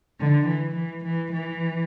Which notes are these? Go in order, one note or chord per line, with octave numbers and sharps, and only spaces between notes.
D3
E3
E3
E3
E3